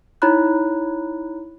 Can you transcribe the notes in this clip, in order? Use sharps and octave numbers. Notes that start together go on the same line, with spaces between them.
D#4 E4 C#5 A#5 B5 F#6